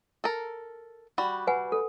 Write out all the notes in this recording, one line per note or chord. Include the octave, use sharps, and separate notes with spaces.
A4 A#4
G3 F#4 B5
B4 F#5 G#5
A4